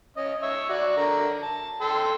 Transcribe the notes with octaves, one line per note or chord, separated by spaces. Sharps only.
C#4 D#5
C#5 E5
F#4 D5
D3 A#4 A#5
A5
A4 G5 C6